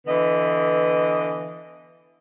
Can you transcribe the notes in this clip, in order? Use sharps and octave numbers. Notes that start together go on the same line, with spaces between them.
D3 E3 B3 D#5